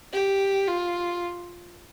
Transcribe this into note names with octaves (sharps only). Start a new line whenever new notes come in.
G4
F4